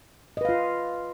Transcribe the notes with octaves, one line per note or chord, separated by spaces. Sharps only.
F4 B4 D#5 F5